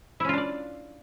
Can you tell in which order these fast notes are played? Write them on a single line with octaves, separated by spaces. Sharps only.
E4 C#4 F4 D4 D5